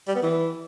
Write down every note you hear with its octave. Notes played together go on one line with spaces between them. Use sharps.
G3
B3
E3